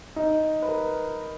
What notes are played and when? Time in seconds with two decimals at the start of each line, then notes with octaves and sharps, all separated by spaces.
0.16 D#4
0.62 B4
0.68 A#4